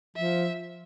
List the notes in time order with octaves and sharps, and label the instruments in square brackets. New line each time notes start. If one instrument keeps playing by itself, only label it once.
[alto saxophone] F3 [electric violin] E5